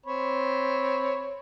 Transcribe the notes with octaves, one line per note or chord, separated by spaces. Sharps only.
C4 C#5 B5